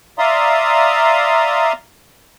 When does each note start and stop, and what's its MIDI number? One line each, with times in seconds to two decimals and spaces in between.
0.18 1.73 74
0.18 1.73 76
0.18 1.73 77
0.18 1.73 82
0.18 1.73 84
0.18 1.73 87